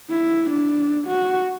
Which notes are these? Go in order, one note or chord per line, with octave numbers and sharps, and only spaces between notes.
E4
D4
F#4